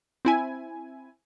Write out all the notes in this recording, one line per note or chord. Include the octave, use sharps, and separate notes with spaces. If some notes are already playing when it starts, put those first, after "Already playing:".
C4 E4 G#5